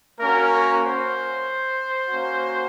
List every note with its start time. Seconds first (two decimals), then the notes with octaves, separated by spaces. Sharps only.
0.19 A#3 C#4 F#4 A#4
0.51 A#4
0.83 C5
2.09 A#3 C#4 F#4